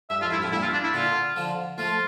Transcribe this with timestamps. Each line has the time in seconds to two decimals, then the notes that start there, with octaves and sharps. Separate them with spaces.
0.10 G2 E5
0.21 F2 F4
0.31 G2 E4
0.42 F2 A2
0.52 G2 A#2 E4
0.62 F4
0.73 D4
0.83 E4
0.94 A#2 D3 F4
1.36 D3 F3
1.78 F3 A3 F4